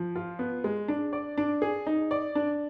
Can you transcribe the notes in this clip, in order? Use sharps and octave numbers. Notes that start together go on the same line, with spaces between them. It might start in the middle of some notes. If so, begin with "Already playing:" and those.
Already playing: F3
F4
B3
G#3
D4
D5
D4
G#4
D#4
D5
D4